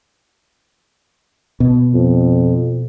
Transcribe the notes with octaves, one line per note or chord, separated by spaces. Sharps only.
B2 B3
F2